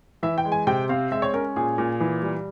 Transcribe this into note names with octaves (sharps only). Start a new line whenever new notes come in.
E3 E5
G5
G#3
G#5
C3 G5
C4 F5
G#3 E5
C#5
C#4 A#4
A#2 G#4
A#2
E3
G3